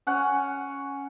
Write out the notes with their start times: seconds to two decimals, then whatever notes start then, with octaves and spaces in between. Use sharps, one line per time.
0.07 C#4 F#5